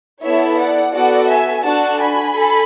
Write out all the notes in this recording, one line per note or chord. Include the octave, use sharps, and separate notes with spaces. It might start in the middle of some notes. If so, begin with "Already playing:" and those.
B3 E4 A4 C#5 E5
D5 F#5
B3 F#4 A4 D5 F#5
E5 G#5
D4 F#4 A4 F#5 A5
G#5 B5
A4